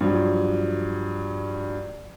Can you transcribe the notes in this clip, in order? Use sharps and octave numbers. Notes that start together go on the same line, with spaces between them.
G2 F3 F#3